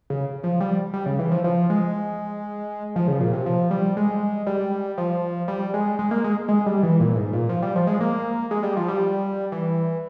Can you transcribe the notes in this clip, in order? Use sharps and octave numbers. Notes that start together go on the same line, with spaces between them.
C#3
F3
G3
G3
C#3
E3
F3
F3
G#3
F3
C#3
A#2
C3
F3
G3
G#3
G3
F3
G3
G#3
G#3
A#3
G#3
G#3
G3
E3
A#2
G#2
A#2
F3
G3
F3
G#3
A#3
G#3
G3
F3
G3
E3